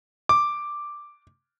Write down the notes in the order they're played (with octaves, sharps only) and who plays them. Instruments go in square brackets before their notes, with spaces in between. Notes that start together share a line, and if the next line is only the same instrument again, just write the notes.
[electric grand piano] D6